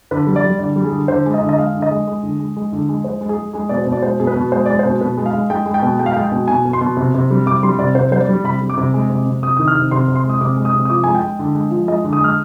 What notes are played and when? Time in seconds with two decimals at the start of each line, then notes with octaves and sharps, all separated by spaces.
0.11 D3 B4
0.27 G3
0.36 D5
0.44 G3
0.59 D3 D5
0.76 G3
0.84 G#4
0.92 D3
1.08 D3 C5
1.26 G#3
1.34 D#5
1.41 D3
1.49 D#5
1.58 G#3 F5
1.74 D3
1.82 D#5
1.91 G#3
2.07 G#3
2.23 D3
2.39 G#3
2.57 G#3
2.73 D3
2.89 G#3
3.04 G#3 C5
3.21 G#3
3.29 G#4
3.37 G#3
3.53 G#3 G#4
3.69 B2 D5
3.78 C5
3.87 B2
3.92 D5
4.02 G#3 C5
4.20 B2 G#4
4.27 B4
4.36 B2
4.52 G#3 C5
4.66 G#3 D5
4.79 C5
4.85 B2
5.01 B2 B4
5.17 G#3
5.26 F5
5.33 G#3
5.50 G#3 G5
5.66 G#3
5.74 G5
5.82 B2
5.99 G#3 G5
6.06 F5
6.13 G5
6.16 G#3
6.23 G5
6.32 B2
6.48 B2 G#5
6.65 B2
6.73 C6
6.81 B2
6.97 C3
7.14 C3
7.30 G3
7.46 C3 D6
7.63 G3 C6
7.79 C3 D5
7.95 C3 C5
8.11 G3 C5
8.20 D5
8.29 G3
8.44 C3 B5
8.61 G3
8.70 D6
8.77 C3
8.94 G#3
9.10 C3
9.26 C3
9.42 C3 D#6
9.57 D#3 D#6
9.68 F6
9.76 C3
9.91 C3 C6
10.08 C3
10.15 C6
10.24 G#3
10.30 D#6
10.41 C3 D6
10.57 G#3
10.65 D#6
10.74 C3
10.85 D#6
10.90 F3 D6
11.04 G#3 G#5
11.15 G5
11.22 G#3
11.39 D3
11.55 G#3
11.71 F3
11.88 G#3 D#5
12.04 D3
12.13 D#6
12.21 G#3 F6